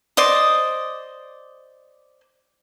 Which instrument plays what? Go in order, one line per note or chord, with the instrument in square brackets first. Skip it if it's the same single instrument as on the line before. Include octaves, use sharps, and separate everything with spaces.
[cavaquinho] C5 D5 D#5 D#6